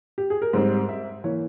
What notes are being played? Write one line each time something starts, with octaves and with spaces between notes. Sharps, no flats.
G4
G#4
A#4
G#2 G3 C4 C5
E5
E3 A#3 C#5